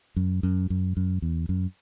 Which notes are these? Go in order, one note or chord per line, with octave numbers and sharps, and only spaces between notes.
F#2
F#2
F#2
F#2
E2
F#2